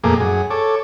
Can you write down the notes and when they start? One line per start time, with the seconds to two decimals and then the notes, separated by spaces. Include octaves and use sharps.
0.04 F2 A#2 A3 A#3 G#4 D6
0.20 F#2 G#4
0.50 A4 C#5 D6